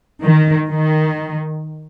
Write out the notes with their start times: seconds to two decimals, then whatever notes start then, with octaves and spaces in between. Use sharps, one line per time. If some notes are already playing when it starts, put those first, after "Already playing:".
0.23 D#3
0.69 D#3